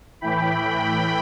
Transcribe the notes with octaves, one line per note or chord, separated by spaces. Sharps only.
A2 E3 G5 B5
A2 E3